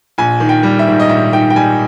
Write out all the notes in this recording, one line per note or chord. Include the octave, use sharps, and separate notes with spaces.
A#1 G#5
D#3
G5
G3
E5
G#2
D#5
A#1 E5
D#3 G5
G5
G3 G#5